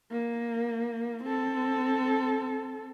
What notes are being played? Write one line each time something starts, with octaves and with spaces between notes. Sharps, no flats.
A#3
C4 A4